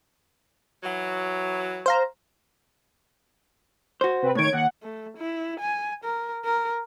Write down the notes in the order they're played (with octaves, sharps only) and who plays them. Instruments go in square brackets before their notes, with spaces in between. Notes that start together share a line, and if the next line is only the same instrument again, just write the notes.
[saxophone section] E3 F#3
[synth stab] C5 F5 A#5
[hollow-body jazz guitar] F#4 C5
[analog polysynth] C3 C4 B4
[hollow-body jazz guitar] A2 D#3 [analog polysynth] C#5 G#6 D7
[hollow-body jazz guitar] D#2 [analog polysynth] F#5
[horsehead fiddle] A3
E4
G#5
A#4
A#4